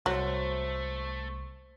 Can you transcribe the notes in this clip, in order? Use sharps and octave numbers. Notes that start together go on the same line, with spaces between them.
C2 F#3 A3 C5